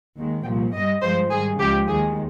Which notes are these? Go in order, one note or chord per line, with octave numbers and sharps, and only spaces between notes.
D#2 D#3 G#3
C2 A#2 F3 G5
G2 G3 D#5
G2 F3 G#3 C5
G#2 D#3 G3 G#4
C#2 C#3 F3 G#3 G4
D#2 D#3 G#3 G#4